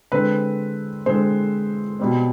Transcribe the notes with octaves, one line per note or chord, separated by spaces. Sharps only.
D3 G#3 C4 B4
D3 G#3 C4 C5
B2 G3 C4